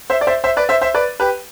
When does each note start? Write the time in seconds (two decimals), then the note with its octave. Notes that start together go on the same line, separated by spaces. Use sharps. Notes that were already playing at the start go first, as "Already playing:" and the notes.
0.10 C5 E5
0.21 D5
0.27 C5 E5
0.44 C5 E5
0.57 B4 D5
0.69 C5 E5
0.82 C5 E5
0.94 B4 D5
1.20 G4 B4